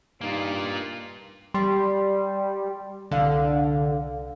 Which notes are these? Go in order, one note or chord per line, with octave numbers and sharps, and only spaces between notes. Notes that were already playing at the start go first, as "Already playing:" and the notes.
G2 A#3 D#4 F4
G3 C6
C2 D3 F5